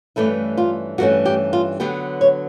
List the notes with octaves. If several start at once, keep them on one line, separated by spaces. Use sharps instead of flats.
G2 E3 A3 C#4 E4
F4
G2 E3 A3 C#4 F#4
G4
F4
D3 F#3 B3 G4
C#5